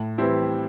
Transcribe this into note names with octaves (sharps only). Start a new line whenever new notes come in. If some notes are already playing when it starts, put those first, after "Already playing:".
Already playing: A2
E3 G3 C4 E4